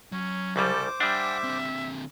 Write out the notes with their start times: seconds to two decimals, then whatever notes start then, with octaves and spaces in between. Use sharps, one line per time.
0.12 F#3 C#4
0.56 C2 C#3 G3 A4 C5 D6
1.00 G3 D4 E5 F#5 G5
1.44 D3 C4